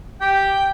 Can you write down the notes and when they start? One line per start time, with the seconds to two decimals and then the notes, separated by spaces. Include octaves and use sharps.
0.21 G4 G5